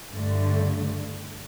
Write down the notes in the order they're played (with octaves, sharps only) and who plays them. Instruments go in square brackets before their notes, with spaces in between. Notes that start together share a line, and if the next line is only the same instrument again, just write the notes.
[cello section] G2 D3 A3